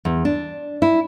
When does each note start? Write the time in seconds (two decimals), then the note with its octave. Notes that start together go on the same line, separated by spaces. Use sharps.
0.05 E2
0.25 D4
0.82 E4